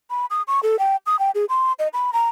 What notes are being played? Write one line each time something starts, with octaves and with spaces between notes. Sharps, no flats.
B5
D#6
C#6
A4
G5
D#6
G5
G#4
C6
D#5
B5
A#5